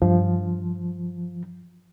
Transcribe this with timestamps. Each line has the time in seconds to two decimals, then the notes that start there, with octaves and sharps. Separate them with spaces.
0.02 G2 F3